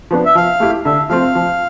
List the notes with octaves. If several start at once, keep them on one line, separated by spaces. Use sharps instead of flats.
F3 B3 D4
E5
F3 F5
A3 E4 G4
D3 E5
F3 A3 C4 F4 F5
F3